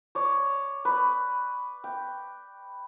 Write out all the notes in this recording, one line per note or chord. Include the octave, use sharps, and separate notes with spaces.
C#5 D5
B4 D5
G5